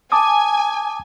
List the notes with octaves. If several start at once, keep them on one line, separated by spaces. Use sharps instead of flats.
G#5 A5 D6 D#6